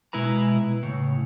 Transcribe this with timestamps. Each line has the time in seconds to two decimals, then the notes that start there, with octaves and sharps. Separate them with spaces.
0.13 B2 G#3 E4 B4 A#5
0.83 A2 C#3